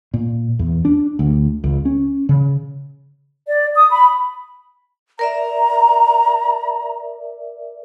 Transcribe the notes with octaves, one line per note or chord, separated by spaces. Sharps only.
A#2
E2
D4
D2
C#2
C#4
C#3
D5
D#6
B5
A#4 D5 E5 A#5